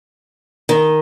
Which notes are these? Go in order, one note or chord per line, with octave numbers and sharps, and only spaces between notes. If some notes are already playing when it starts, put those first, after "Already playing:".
D#3